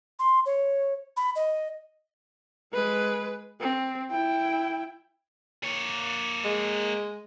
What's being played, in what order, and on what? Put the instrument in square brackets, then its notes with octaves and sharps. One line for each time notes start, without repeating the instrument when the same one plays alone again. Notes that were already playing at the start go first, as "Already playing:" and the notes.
[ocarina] C6
C#5
B5
D#5
[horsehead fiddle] G#3 B4
C4
E4 G5
[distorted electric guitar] A#3 C#5
[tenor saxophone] G#3